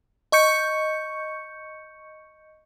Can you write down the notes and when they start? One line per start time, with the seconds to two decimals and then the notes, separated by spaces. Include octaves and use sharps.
0.32 D#5 C#6 G6 C#7